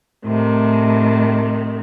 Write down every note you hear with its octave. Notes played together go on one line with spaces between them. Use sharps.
A2 C3 D#3